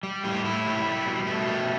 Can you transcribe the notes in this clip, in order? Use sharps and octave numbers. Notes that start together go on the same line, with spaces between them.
G3
A2 G4
A2 E4
G3
G3
B2
B2 A3
G3